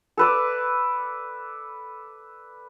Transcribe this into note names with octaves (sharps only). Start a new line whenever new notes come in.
A4 B4 D5